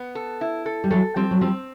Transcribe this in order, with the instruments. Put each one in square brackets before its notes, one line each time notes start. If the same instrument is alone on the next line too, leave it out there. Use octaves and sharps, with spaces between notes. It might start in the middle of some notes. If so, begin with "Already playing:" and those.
Already playing: [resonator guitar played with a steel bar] B3
A4
E4
A4
[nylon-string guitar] G3
[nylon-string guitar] E3 F#3 [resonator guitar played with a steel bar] A4
[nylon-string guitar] F3 G3 [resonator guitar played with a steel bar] C4
[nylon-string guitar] F#3
[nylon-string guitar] F3 G3 [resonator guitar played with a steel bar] C4